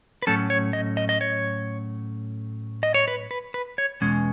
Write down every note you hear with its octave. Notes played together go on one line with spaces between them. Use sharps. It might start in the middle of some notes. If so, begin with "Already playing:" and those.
B4
A2 F#3 A3 C#4 A4
C#5
D#5
D#5
D#5
C#5
D#5
C#5
B4
B4
B4
C#5
E2 B2 G#3 C#4